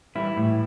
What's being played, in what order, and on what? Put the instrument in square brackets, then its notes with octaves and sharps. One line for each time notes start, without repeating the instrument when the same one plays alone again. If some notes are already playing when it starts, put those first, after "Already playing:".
[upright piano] E3 G3 [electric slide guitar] E4
[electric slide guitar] A2